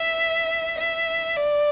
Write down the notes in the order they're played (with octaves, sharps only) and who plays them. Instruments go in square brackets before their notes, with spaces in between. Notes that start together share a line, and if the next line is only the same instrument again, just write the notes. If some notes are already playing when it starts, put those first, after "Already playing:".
Already playing: [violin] E5
E5
D5